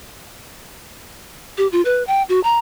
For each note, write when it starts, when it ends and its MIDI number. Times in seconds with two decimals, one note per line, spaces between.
1.58 1.67 67
1.72 1.81 65
1.85 2.03 71
2.07 2.23 79
2.29 2.40 66
2.44 2.58 82